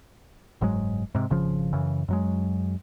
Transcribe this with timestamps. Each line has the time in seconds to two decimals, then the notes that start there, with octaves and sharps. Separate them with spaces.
0.61 F#1 G#2 F#3 G#3
1.15 G#2 C3
1.30 G#1 C#3 F3
1.73 F#2 C#3 E3
2.08 F#2 F#3 G#3